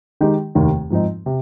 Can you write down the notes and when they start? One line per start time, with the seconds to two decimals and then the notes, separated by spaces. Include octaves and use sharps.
0.21 D#3 G#3 D#4 G4
0.55 F1 D#2 D#3
0.90 G#2 F3 C4 D#4
1.26 C3